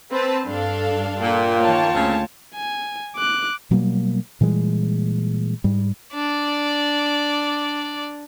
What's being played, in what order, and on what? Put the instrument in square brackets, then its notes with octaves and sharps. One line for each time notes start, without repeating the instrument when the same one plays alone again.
[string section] C4 B4 A5
[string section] G2 [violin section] D4 A4 F5
[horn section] A#2 [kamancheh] F4 G5
[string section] D#3 A#3 [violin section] C#5 A5
[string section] D2 [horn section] C#3 C4
[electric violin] G#5
D6 F#6
[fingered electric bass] B2 F#3 G3 A#3
A#2 E3 G3 G#3
G#2 G3
[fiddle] D4 D5